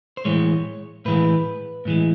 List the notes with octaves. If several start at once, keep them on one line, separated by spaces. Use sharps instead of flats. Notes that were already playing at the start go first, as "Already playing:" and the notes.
C5
A2 E3 G#3 C#5
A2 E3 G#3 B4
A2 E3 G#3